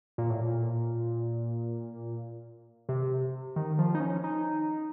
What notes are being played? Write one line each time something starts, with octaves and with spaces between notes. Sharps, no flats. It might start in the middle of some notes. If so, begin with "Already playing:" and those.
A#2
A2
A#2
C3
D#3
F3
D#4
C#4
D#4